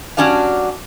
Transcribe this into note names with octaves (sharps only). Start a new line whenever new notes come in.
F#3 C#4 D4 G4 F5